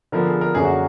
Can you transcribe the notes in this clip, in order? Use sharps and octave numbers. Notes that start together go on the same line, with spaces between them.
D3 F3 B3 A#4
G#4
A#4
F#2 D3 F#3 A#3 G#4
F#4